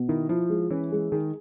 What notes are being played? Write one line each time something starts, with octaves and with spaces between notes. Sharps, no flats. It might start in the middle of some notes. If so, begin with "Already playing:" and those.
Already playing: B2
D#3 E4
F3 E4
G#3
E3 C#4
G#3
D#3 G#4